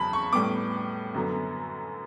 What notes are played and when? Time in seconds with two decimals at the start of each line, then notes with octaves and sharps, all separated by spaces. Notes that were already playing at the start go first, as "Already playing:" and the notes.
Already playing: E2 C#3 F#3 A5 B5
0.13 C#6
0.33 A2 G3 B3 D6
1.14 F#2 D3 F#3 B3